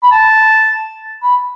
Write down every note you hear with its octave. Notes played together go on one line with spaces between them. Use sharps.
B5
A5
B5